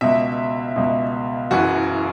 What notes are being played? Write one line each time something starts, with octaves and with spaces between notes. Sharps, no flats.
C#2 B2 E5
C#2 B2
F#1 F#2 E3 F#4